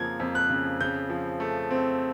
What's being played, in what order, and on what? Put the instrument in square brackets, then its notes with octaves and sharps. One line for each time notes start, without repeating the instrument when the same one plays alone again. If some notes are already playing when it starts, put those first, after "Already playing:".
Already playing: [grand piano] F2 C#3 F3 A#3 G#6
F2
F#6
C#3
C#3 G6
F3
A3
C4